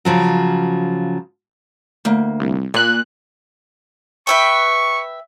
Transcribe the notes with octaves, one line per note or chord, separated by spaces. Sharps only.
C#3 F3 F#3
D2 A#3
C2
A#2 G#5 F#6
B4 E5 G5 C#6